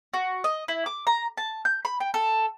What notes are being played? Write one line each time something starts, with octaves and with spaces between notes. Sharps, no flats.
F#4
D#5
E4
D6
A#5
A5
G6
B5
G5
A4